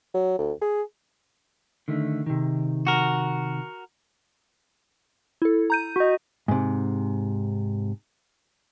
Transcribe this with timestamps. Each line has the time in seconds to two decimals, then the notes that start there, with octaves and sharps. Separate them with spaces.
0.14 F#3
0.39 D2
0.62 G#4
1.88 D3 D#3 A3
2.26 C3 D#3
2.87 F#4 A#4
5.42 E4 A4
5.70 A#5 G6 D#7
5.96 F#4 D#5
6.48 G#2 C3